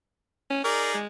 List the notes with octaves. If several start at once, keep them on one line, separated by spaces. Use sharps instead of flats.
C#4
D#4 G#4 A#4 D5
G#3